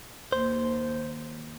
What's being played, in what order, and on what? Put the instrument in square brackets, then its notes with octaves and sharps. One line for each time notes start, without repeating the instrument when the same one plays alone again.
[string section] D#2 [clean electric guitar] C5